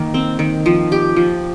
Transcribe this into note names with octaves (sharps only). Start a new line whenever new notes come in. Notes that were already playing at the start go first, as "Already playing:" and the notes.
Already playing: D#3 A#3
C4
D#3
F3
G4
F3